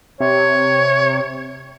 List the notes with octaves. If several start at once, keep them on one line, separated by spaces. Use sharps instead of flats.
C3 C#5